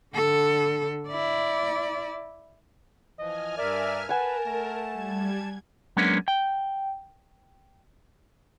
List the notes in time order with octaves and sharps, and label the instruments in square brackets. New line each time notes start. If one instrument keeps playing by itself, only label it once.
[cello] D3 A4
E4 D5
[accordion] E3 F3 [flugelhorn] D#5 [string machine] G#5 F6
[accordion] G2 A#4 E5 [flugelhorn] D5
[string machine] A#4 [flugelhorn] B4 [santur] F#5 G#5 [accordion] A5
[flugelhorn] A3
[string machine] G3 G#6
[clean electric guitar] F#3 G#3 A#3 B3 C#4 D4
G5